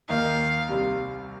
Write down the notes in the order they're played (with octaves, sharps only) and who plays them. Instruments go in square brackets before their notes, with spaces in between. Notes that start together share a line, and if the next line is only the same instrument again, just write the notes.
[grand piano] D#2 D#3 A#3 D#4 [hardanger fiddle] F5
[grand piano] C2 C3 G3